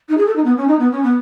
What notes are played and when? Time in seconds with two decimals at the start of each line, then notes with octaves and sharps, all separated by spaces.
0.09 D#4
0.17 G#4
0.26 A4
0.36 D#4
0.44 B3
0.57 C#4
0.67 D#4
0.79 B3
0.92 C#4
1.03 B3